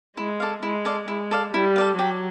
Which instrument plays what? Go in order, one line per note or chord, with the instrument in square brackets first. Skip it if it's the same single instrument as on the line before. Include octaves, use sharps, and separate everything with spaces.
[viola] G#3 [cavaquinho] E4
[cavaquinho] A4 D5 F5
[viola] G#3 [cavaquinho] E4
[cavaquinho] A4 D5 F5
[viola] G#3 [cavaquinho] E4
[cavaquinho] A4 D5 F5
[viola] G3 [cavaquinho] E4
[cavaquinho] A4 D5 F5
[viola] F#3 [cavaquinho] G4